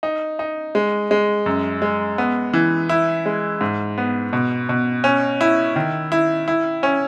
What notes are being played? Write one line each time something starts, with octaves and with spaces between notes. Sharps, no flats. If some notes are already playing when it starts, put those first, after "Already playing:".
D#4
D#4
G#3
G#3
F#2
G#3
B3
E3
E4
G#3
G#2
B3
B2
B2
C#4
E4
D#3
E4
E4
C#4